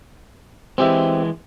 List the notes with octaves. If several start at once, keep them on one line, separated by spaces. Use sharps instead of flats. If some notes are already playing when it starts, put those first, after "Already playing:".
E3 G#3 C4 G4 E5